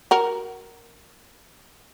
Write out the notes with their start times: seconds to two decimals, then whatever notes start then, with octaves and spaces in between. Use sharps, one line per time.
0.11 F#4 A#4